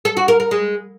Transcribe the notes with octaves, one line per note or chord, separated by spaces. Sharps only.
A4
F#4
A#4
A#4
G#3